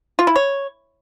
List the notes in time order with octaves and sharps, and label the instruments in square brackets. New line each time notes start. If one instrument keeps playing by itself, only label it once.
[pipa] F4
E4
C#5